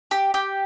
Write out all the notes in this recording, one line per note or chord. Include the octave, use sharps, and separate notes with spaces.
G4
G4